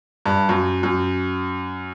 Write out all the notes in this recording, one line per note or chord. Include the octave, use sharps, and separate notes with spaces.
G2
F#2
F#2